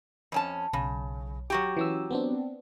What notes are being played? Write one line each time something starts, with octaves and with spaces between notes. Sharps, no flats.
F2 C#4 A5
B1 C#3
F#3 F#4 G4
E3 C#4 E6
B3 C4 D4